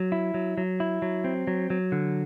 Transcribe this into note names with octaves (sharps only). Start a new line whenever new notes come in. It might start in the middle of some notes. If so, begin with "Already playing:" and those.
Already playing: F#3
E4
F#3
F#3
E4
F#3
C4
F#3
F#3
D3